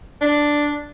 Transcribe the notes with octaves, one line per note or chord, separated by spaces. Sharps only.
D4